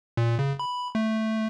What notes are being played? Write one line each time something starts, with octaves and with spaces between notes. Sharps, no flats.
A#2
C#3
B5
A3